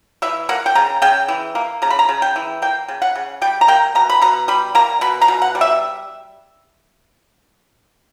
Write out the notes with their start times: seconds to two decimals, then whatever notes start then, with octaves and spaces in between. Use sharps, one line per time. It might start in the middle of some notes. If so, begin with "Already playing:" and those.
0.22 E3 E5
0.49 A#3 F#5
0.66 G5
0.75 C#3 A#5
1.02 C#3 G5
1.28 E3
1.55 A#3
1.82 C#3 A#5
1.90 B5
1.99 A#5
2.09 C#3
2.22 G5
2.36 E3
2.62 A#3 G5
2.88 C#3
3.02 F#5
3.16 C#3
3.42 G3 G5
3.61 A#5
3.68 A#3 G5
3.95 B2 A#5
4.10 B5
4.22 B2 A#5
4.48 G3 B5
4.75 A#3 A#5
5.01 B2 B5
5.22 A#5
5.28 B2
5.42 F#5
5.55 G3
5.61 E5